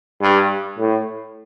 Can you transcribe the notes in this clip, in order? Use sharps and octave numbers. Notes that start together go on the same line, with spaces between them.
G2
A2